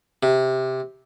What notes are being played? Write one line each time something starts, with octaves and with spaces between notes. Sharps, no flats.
C3